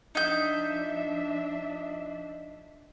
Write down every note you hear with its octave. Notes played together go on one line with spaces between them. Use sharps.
F3 D4 D#4 E5 G6